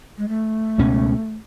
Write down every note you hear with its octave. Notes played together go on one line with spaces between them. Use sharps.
G#3
A3
C#2 B2 G#3 C#4